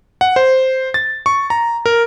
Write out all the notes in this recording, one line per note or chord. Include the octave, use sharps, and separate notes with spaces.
F#5
C5
A6
C#6
A#5
A#4